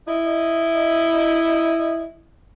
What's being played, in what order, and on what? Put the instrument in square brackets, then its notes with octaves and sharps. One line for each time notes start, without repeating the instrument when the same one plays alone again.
[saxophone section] E4 D#5